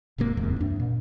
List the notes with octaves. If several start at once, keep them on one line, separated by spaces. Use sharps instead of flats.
D1 G#2 C3 A#3
D1 E2 G#2 C3
F#2 D4
A#2